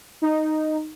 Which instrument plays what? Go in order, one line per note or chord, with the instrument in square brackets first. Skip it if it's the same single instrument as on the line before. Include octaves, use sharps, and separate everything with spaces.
[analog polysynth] D#4